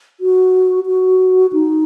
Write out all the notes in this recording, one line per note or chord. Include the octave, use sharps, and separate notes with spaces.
F#4
F#4
D#4